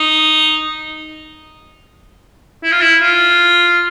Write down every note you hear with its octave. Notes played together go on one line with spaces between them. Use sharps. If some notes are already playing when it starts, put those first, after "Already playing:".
Already playing: D#4
E4
F4
E4
F4